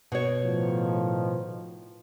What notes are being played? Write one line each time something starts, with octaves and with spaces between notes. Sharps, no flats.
B2 C#5
A2 D#3 F3